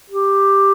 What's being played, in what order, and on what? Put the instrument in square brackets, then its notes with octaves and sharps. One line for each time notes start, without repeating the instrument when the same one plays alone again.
[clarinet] G4